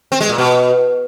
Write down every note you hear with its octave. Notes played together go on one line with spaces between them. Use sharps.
C4
G#3
A#2
B2